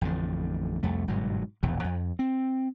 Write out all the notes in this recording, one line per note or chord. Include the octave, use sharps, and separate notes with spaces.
A1 F2 A2 D3
C2 F2 A3
G1 G#2 B2 F#3
E1 A#1 E2 E3
F2
C4